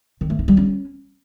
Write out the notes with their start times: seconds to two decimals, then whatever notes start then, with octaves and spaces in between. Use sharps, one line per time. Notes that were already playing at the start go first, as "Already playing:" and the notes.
0.21 D#3
0.30 A3
0.39 D#4
0.48 G3
0.57 C#4